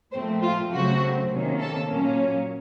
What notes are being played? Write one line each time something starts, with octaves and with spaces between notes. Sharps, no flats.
A#2 F3 A3 C4 C5
F4
C#3 F#3 A3 C4 F#4
C3 D#3 A#3 C#4
A4
A#2 F#3 A#3 C#4